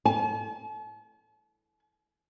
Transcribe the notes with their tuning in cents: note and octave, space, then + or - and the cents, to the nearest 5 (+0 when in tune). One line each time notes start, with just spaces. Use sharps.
A5 -45